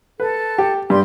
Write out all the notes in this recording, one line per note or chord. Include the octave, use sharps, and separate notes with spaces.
A4 B4
G4
G2 G4 D5 C6